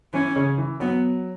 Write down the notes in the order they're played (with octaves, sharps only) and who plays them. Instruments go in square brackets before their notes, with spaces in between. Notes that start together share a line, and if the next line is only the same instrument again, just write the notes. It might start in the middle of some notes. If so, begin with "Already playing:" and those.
[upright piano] E3 [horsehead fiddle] C#4
[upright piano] C#3
E3
[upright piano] F#3 [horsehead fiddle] B3